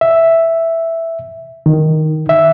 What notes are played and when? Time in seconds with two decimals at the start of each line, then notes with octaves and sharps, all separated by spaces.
0.01 E5
1.66 D#3
2.29 E5